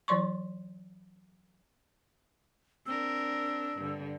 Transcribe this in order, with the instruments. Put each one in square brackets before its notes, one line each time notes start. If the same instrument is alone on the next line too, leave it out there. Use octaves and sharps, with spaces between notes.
[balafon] E3 F#3 D5 C6 C#6
[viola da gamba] C4 D4 A#4 [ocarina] E6
[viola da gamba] G2 D3